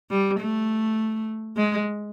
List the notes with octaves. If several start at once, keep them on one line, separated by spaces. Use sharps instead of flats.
G3
A3
G#3